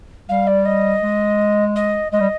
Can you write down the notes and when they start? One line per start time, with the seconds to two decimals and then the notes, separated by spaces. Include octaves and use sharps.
0.29 G3 F5
0.47 D5
0.65 D#5
1.03 G#3
1.76 D#5
2.12 G#3 D#5
2.20 G3